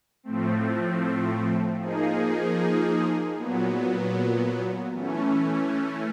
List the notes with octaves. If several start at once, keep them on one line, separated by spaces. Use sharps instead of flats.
A2 F3 A3 C4
F3 A#3 D#4 G#4
A#2 F#3 B3
E3 A3 C#4